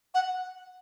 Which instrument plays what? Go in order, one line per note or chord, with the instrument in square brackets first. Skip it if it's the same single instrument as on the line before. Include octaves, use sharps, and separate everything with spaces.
[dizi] F#5